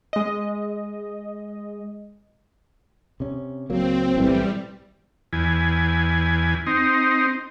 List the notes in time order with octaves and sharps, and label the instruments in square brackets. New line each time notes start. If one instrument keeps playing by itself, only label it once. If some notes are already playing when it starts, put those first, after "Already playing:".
[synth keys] G#3 D#5
[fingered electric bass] C3 C#4
[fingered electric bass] C#2 F#3 A#3 [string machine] C4
[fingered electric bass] B1 A2 E3 [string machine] G3
[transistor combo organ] E2 G#5
C4 D#4